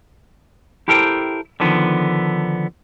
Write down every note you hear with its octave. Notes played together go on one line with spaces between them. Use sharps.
E4 G4 A4 A#4 C5 G5
D3 D#3 F3 B3